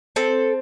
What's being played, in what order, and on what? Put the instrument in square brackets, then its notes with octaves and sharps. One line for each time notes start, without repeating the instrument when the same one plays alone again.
[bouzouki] C4 A4